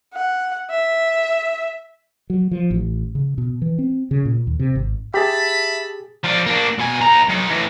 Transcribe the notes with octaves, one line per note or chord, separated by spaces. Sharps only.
F#5
E5
F#3
F3
A1
C#3
B2
E3
C4
C#3
A#2
D#2
C3
G#1
G4 G#4 E5 A5 B5
F3 D4
A#3 D4
B2 G#5
D#2 A#5
F#3 D#4
A2 E3